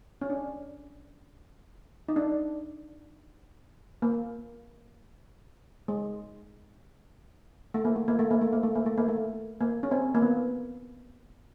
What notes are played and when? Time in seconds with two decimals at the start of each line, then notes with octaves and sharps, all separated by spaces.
0.21 C#4
0.30 D4
2.08 D#4
2.16 D4
4.02 A#3
5.88 G#3
7.74 A3
7.85 A#3
7.96 A3
8.08 A#3
8.19 A3
8.31 A#3
8.41 A3
8.53 A#3
8.63 A3
8.75 A#3
8.86 A3
8.98 A#3
9.08 A3
9.61 A#3
9.83 C#4
9.91 C4
10.15 A#3
10.22 B3